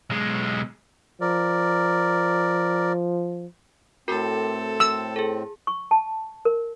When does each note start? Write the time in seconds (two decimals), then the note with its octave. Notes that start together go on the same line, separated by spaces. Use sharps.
0.10 B1 G#3
1.21 F3 A#4 D5
4.08 A2 C4 F#4 A4 A#4
4.80 E6
5.16 G#4 A4
5.67 C#6
5.91 A5
6.45 A#4